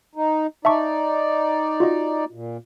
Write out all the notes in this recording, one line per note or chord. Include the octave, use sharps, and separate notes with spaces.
D#4
D#4 D5 E5 A5 C#6
F4 F#4 D#5
A#2